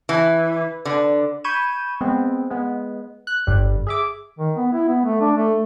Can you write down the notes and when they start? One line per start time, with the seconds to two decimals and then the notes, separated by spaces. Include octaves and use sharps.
0.09 E3
0.85 D3
1.44 B5 C#6 G6 G#6 D#7 E7
2.01 G#3 B3 C4
2.50 G#3 B3
3.27 F#6
3.47 G1 G2 G3
3.87 G#4 E5 D6
4.39 D#3
4.57 B3
4.74 E4
4.88 B3
5.05 A3
5.21 D4
5.37 A3